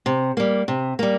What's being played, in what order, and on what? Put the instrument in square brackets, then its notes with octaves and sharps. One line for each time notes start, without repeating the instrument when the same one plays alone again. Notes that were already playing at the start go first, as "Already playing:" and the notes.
[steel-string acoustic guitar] C3
G3 A#3
C3
G3 A#3